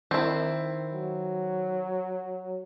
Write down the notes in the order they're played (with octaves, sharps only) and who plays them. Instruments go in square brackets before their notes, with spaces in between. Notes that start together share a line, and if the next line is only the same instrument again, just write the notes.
[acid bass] D#3 [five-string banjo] C4 E4
[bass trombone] F#3